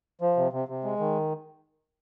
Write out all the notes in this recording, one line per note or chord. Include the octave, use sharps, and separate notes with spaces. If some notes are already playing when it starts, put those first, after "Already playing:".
F3
C3
C3
C3
G#3
D#3